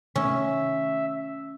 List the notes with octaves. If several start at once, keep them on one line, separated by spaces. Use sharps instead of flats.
C3 D#3 A3 C#4 E5